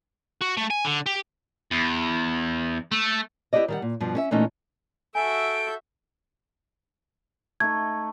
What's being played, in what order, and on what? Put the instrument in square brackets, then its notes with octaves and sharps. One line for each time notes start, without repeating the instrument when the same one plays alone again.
[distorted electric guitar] F#4
A3
G#5
D3
G4
E2
A3
[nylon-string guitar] E4 G4 G#4 B4 D5 D#5
D#3 G3 F#5
A#2
G2 B2 F3
C#4 G#4 E5
A#2 E3 A3 C#4 D#4
[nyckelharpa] F#4 E5 [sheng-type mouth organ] A4 G6 [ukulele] G#5 A#5 [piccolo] D7
[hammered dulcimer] A3 D#4 [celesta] G#6